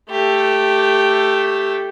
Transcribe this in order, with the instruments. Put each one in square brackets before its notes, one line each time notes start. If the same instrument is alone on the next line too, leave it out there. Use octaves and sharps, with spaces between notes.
[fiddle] A3 G4